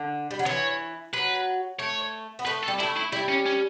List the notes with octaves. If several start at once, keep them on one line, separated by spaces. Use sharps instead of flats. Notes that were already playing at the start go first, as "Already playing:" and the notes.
Already playing: D3
G3
F#3
E3 C#5
F#3 B4
A3 C#5
B3
A3 B4
A4
G3
A3 E4
E4
G3 E4
C#4
C#4